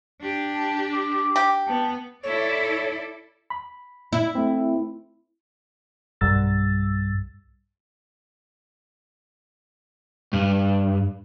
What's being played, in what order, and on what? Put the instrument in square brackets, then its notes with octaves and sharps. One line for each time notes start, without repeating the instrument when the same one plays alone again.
[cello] D4 G4
[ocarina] A5
D6
[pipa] G4
[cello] B3 [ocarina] A5
[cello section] E4 A4 D5 [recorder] C#5
[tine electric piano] B5
[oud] E4
[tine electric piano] A3 C4
[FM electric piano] B1 G2 G3 E6 A6
[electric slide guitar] G2